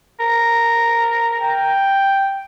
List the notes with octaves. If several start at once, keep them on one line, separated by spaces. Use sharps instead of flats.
A#4
G5